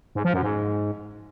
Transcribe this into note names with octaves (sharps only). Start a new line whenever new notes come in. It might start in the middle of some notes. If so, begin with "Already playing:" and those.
G#2
F3
F#2
G#2